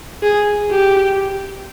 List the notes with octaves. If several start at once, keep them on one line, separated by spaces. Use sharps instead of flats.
G#4
G4